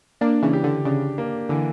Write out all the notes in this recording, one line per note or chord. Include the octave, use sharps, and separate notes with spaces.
A#3 D4 D5
C#3 E3
G4
D3
C#3 D4
A#3
D3 E3